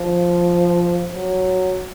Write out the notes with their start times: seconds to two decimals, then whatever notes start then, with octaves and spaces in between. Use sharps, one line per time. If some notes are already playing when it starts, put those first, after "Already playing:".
Already playing: F3
1.13 F#3